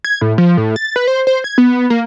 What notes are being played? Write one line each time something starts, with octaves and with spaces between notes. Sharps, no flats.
G#6
A2
F3
A2
A6
B4
C5
C5
G#6
B3
A#3